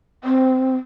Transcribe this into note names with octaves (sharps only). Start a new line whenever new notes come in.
C4